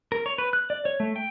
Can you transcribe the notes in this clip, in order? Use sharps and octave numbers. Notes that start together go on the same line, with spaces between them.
A#4
C#5
B4
F#6
D5
C#5
A3
G5